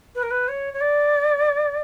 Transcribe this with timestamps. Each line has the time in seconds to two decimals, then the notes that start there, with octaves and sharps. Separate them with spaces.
0.15 B4
0.22 A#4
0.30 B4
0.48 C#5
0.73 C#5
0.80 D5